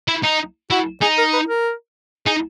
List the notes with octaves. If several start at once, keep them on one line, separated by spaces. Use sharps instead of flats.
E4
D#4
E4 F#4
D#4 G#4
A#4
B4
A#4
D#4 G#4